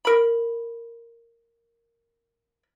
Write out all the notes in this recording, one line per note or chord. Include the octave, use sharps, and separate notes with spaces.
A#4 B5